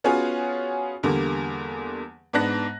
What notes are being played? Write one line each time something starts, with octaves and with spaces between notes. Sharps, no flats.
B3 C#4 F4 F#4 G#4 G#5
E2 D3 G3 A#3
G#2 B3 D4 A5 F#6 A#6